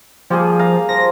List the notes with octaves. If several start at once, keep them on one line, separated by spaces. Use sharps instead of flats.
F3 G3 A#3 G#4
F5 A#5
F3 A#6